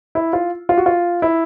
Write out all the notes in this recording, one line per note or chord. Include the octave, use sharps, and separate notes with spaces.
E4
F4
F4
F#4
F4
E4